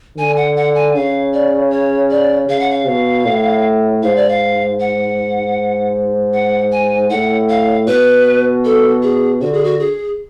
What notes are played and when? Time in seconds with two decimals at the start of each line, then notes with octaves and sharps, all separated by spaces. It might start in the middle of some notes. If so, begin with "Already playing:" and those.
0.18 D3 G#5
0.37 F#5
0.56 F#5
0.75 G#5
0.96 C#3 F5
1.34 D5
1.72 C#5
2.10 D5
2.48 C#3 F5
2.60 F#5
2.70 F5
2.88 B2
3.26 A2
4.03 G#2 F5
4.16 D5
4.29 F5
4.80 F#5
6.33 F#5
6.72 G#5
7.10 A2 F#5
7.49 F5
7.87 B2 B4
8.65 A4
9.03 G#4
9.41 D3 F#4
9.53 G#4
9.64 F#4
9.80 G#4